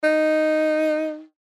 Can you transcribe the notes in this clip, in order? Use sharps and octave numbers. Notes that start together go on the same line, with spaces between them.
D#4